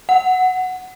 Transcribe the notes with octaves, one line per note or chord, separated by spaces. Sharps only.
F#5